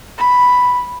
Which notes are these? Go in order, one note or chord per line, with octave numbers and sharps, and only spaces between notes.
B5